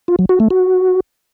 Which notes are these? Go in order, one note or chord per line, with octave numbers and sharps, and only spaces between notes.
F4
F#3
F#4
A3
F#4